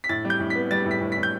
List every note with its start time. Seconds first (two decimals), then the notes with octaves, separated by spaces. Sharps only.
0.04 B6
0.09 A2 A6
0.25 G3
0.30 G6
0.40 A2
0.50 B6
0.55 B3
0.71 G3 A6
0.86 A2 B6
1.01 A2
1.12 B6
1.17 A2
1.23 G6